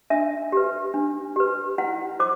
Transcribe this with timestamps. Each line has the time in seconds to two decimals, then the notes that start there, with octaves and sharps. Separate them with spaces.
0.10 D4 E5
0.52 G4 B4
0.94 D4
1.36 G4 B4
1.78 E4 F#5
2.19 C5 D6